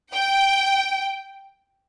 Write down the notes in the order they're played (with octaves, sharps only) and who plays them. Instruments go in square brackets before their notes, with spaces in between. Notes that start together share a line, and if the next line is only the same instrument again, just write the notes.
[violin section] G5